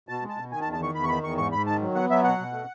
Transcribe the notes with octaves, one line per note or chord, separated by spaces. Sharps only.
B2 A5
G#3
A5
B2
D#3 G#5
A5
E2
A5
D#3 C#6
E2 B5
C#6
D#3 B5
E2 C#6
G#2 C#6
G#2 B5
D#3 A5
F#3
B3 F#5
F#3 E5
B2 F#5
B2
A3